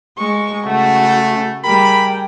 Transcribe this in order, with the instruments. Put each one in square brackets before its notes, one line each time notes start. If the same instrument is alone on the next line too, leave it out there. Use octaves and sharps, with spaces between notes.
[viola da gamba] G#3 [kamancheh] C#6
[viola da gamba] C#3 [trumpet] A3 [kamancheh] F#4
[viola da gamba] G3 [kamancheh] G#4 A#4 [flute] G5 [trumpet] B5